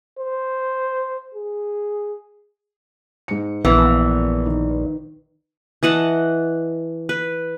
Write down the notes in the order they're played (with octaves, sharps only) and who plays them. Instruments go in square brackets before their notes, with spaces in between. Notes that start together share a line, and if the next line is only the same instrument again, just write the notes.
[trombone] C5
G#4
[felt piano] G#2 C#7
[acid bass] A#1 [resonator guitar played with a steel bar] E3 [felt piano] B3
[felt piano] D#3
[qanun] E3 D#5 F#5 A5
B4